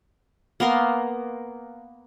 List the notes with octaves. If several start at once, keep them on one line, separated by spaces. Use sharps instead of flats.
A#3 B3 A#4 C6